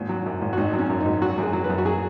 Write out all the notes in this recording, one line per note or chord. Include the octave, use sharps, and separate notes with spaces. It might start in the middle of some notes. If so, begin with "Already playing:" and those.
Already playing: G#1 D#2
F#3
F#2
G#1
F#4
G#1 D#4
F#3
C#4
F#2
D#4
G#1
F#3 F#4
F#2
G#4
F#3
B4
F#2
F#4
F#3 G#4